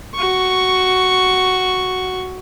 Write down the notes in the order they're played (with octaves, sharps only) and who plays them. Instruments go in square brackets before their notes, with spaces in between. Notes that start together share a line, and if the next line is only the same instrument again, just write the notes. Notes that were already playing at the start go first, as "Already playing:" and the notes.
[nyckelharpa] F#4 C#6